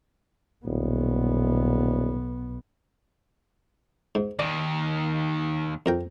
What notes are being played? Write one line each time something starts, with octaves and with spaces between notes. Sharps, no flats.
D#1 B1 B3
G#2
D#2 D#3 D5
F2 A#4 G5